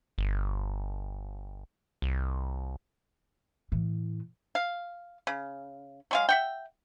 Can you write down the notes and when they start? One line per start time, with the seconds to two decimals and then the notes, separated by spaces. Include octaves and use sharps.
0.18 G1
2.02 C2
3.72 A2 E3
4.55 F5
5.27 C#3
6.11 F#3 G#3 F5
6.29 E5 F#5 G5